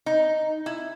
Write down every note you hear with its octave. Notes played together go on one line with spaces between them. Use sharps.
D#4
E4